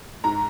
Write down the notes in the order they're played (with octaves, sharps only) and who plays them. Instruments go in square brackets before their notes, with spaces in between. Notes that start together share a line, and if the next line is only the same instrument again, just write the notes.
[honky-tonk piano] G#2 A#5